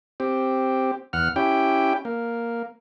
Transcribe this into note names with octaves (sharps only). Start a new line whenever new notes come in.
C4 G4
E2 F#5 F6
C#4 E4 G4 G5
A#3